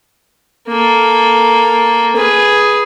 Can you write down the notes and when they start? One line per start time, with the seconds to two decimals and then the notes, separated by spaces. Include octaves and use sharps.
0.68 A#3 A4
2.16 G#4 B4